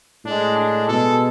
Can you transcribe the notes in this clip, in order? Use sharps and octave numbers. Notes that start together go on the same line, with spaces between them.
A2 G#3 D4
D4
B2 G#3 A4